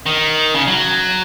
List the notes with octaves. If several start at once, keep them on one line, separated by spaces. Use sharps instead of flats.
D#3
C#3
F#3